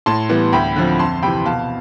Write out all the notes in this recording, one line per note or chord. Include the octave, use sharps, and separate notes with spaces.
A2 A5 C6
E3 G3 B3
D2 G5 B5
D3 F3 C4
F2 A5 C6
C3 E3 G5 B5
B2 F5 A5